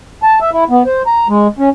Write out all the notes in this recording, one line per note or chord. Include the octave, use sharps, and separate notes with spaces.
A5
E5
E4
B3
C5
A#5
G#3
C#4